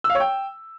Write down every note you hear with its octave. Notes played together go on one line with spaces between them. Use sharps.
E6
F5
C#5
G5